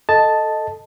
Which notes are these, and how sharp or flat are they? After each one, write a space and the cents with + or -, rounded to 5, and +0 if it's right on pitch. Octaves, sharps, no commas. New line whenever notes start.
A4 +0 D#5 +0 A5 +0